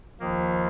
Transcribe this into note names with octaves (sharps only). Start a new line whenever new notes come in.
D#2 D#3 F3 A#3